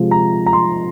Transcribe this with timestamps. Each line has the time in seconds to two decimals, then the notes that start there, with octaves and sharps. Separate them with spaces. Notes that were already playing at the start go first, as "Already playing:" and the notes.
Already playing: C3 F3 G#3
0.11 A#5
0.46 A#5
0.53 C6